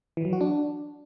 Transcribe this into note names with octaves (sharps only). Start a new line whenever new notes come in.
E3
F#3
F#4
D4